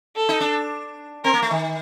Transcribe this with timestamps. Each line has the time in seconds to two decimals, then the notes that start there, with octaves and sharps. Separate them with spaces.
0.16 A4
0.29 D#4
0.41 D4
1.24 C4 A#4
1.34 A#3
1.42 A3
1.51 D#3